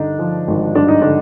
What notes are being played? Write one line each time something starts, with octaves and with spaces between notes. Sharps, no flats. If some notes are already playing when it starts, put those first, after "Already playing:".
Already playing: G2 D3 D4 D#4
F3
G#1
G2 D4
D#4
D3 D4